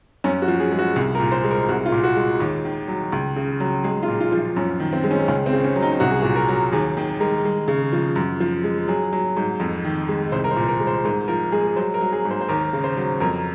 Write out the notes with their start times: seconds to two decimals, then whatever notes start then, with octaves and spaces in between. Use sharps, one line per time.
0.24 F#2 C#4
0.42 F#4
0.48 F3
0.60 G#4
0.72 G#3
0.79 F#4
0.96 C2 G#4
1.15 A#4
1.20 A#2
1.32 C5
1.44 G#3
1.51 A#4
1.69 C2 F#4
1.86 F4
1.92 A#2
2.04 F#4
2.16 G#3
2.40 D#2
2.65 D#3
2.88 F#3
3.12 C#2
3.36 C#3
3.60 F#3
3.84 G#3 G#4
4.03 F4
4.08 A#2
4.21 F4
4.32 F3
4.39 F4
4.56 F#2 C#4
4.80 D#3
4.93 C4
5.04 G#3
5.11 C#4
5.28 C#2 C#4
5.46 C4
5.53 C#3
5.64 C#4
5.76 F#3
5.82 D#4
6.00 C2 F#4
6.11 G#4
6.22 A#2 F#4
6.36 A#4
6.48 F#3
6.72 D#2 G#4
6.97 D#3
7.20 G#3 A#4
7.44 G#3
7.68 C#3
7.93 F3
8.16 F#2
8.40 F3
8.64 G#3
8.88 F#3 G#4
9.13 F#3
9.37 G#2
9.60 F2
9.85 D#3
10.09 G#3
10.32 C2 C5
10.44 A#4
10.51 C5
10.56 A#2
10.68 A#4
10.80 G#3
10.87 C5
11.05 G#2 A#4
11.28 F3 A#4
11.52 G#3 G#4
11.76 F#3 C5
11.94 A#4
12.01 F#3
12.13 G#4
12.25 G#2
12.31 C5
12.41 C5
12.49 D#2 A#4
12.73 C#3
12.84 C5
12.97 F#3
13.20 F2 A#4